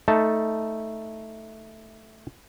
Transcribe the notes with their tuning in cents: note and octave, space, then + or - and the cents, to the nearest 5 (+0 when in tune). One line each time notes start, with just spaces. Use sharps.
A3 +0 D#4 +10 A5 +0